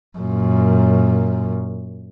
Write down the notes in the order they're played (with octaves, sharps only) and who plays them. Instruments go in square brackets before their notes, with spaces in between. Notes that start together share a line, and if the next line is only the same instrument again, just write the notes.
[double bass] F#2 A#2